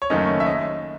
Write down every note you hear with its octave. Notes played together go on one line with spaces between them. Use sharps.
C#5
F#1 F#2 D#3 A3 C#4 D#5
E5
D#5